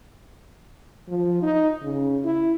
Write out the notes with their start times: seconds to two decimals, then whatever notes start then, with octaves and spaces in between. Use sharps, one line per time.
1.08 F3
1.42 D#4
1.82 C#3
2.24 E4